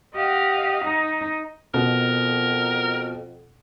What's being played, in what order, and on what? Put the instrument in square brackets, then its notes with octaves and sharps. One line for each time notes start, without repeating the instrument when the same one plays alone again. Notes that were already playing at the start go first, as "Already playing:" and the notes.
[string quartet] G4 D#5 F5 F#5
D#4
[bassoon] F2 [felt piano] B2 [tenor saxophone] A#4